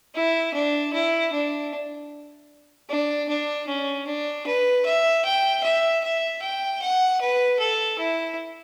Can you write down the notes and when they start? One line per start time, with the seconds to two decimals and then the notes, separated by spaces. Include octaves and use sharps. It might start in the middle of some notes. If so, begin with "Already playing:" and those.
0.15 E4
0.54 D4
0.94 E4
1.33 D4
2.89 D4
3.29 D4
3.68 C#4
4.06 D4
4.47 B4
4.85 E5
5.25 G5
5.63 E5
6.03 E5
6.42 G5
6.82 F#5
7.21 B4
7.59 A4
7.99 E4